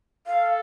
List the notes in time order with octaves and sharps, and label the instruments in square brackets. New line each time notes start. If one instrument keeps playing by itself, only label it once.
[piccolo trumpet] A4 [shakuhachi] F5